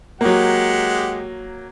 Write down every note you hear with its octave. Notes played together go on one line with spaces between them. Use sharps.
F#3 G#3 A#3 G4 F#5